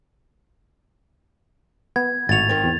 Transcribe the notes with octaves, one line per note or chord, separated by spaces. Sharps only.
B3 G#6
G#1 A2 F#4 A6 F7
D#3 C4
E2